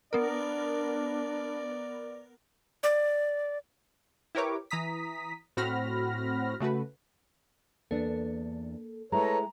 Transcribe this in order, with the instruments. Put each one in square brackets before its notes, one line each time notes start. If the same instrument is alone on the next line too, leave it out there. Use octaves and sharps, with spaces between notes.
[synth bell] B3 A#4 [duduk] D4 [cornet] D5
[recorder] D5
[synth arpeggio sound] E4 G4 A#4 B4 C#5 D6
E3 A#5 D#6 B6
A2 C4 F#4 B5 F6 A#6
C#3 A3 F#4 B4
[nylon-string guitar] E2 D4 [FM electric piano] A#3 A4
[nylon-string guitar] G#3 A3 E4 [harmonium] A4 B4 C#5 [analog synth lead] A#5